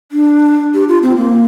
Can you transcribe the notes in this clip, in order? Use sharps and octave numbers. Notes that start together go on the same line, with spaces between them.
D4
G4
F4
C4
A#3